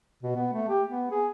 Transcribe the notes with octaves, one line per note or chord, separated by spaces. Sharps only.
B2
B3
A3
G4
B3
G#4